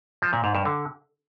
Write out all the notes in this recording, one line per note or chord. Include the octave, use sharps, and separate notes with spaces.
F3
A#2
G#2
G2
D3